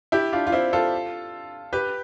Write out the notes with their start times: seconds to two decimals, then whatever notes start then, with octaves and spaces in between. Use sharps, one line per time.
0.12 E4 G4
0.33 D4 F4
0.47 F4
0.52 C4 E4
0.73 F4 A4
1.73 G4 B4